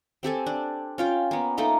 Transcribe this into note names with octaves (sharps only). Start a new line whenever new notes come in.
C4 G4 A4 G#5
D4
C#4 F4 G5
A#3 B3
A3 A#3 D#4 A4